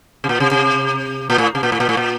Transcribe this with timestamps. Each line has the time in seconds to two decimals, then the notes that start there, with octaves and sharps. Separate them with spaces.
0.24 C3
0.29 A#2
0.40 C3
0.51 C3
1.30 A#2
1.38 A2
1.55 C3
1.63 A#2
1.72 A2
1.80 A#2
1.89 A2
1.97 A#2